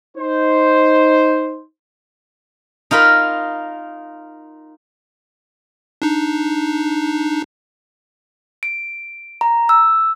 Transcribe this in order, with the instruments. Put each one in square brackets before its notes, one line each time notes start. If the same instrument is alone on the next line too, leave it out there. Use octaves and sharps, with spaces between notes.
[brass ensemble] D#4 C5
[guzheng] D#4 F4 A#4 B5
[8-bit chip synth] D4 D#4
[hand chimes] D7
A#5
E6